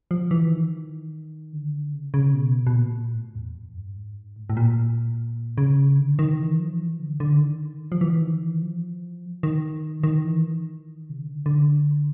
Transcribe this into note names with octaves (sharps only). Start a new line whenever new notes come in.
F3
E3
D#3
D3
C#3
C#3
B2
B2
A#2
A2
E2
F2
G2
G#2
A2
A2
A#2
C#3
D3
D#3
E3
F3
E3
D3
D3
D#3
F3
E3
D#3
E3
F3
D#3
D#3
E3
D#3
C3
C#3
D3
D3